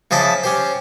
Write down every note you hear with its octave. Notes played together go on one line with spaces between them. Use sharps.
C#3 F3 D#5 E5 A5 D6
C#4 G4 C5